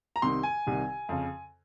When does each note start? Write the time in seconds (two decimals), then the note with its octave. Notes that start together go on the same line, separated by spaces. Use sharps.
0.16 A#5
0.22 C2 C3 D#3 C6
0.43 G#5
0.66 C2 C3 D#3
1.09 F2 C#3